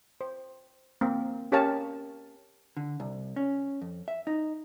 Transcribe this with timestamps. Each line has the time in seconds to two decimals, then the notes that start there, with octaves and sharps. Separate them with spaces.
0.21 C5
1.01 A#3 C4
1.52 C#4 G4 A#4 C#5 F5 A5
2.77 D3
3.00 C2
3.36 C#4
3.82 F2
4.08 E5
4.27 D#4